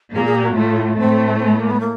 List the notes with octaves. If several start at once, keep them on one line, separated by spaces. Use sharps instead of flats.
A#2 A#3 G#4
G#4
G4
F#4
A2 A3 F4
A2 A3 C4
C4
B3
A#3
B3
A#3